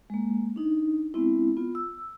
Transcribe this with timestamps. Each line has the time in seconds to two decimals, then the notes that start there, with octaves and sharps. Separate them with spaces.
0.10 G#3 A#3
0.56 D4 D#4
1.14 G#3 B3 C4 D4 E4
1.57 B3 F4
1.75 E6